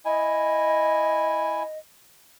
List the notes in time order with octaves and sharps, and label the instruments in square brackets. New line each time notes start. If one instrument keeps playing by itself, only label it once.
[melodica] E4 G#5 [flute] D#5